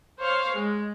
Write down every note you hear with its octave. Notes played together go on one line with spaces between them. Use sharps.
C5 C#5 F5
G#3